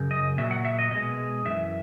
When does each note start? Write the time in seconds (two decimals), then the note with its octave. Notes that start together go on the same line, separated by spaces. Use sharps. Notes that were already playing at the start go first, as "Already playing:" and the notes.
Already playing: F#2 C#3
0.11 D#5
0.38 A#2 F#3 E5
0.51 F#5
0.65 E5
0.79 D#5
0.91 B2 G#3 D#5
1.45 F#2 E3 E5